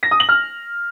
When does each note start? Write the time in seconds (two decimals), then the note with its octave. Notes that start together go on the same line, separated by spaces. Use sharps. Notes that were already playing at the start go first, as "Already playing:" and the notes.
0.03 A#6
0.11 D#6
0.20 F#7
0.29 F6